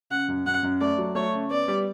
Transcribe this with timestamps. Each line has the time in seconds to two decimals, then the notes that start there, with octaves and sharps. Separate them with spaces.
0.11 C#3 F#5
0.28 F#2
0.46 F#2 F#5
0.63 F#2
0.81 A3 D5
0.98 F#3
1.15 A3 C#5
1.33 C#3
1.51 B3 D5
1.68 G3